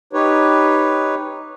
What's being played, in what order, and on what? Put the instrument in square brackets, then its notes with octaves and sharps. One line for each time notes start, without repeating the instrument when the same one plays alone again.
[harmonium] D#4 G4 B4 C#5